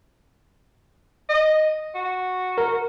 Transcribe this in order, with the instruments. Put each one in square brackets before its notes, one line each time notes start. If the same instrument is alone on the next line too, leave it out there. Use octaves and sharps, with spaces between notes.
[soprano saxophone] D#5
F#4
[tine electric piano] A#4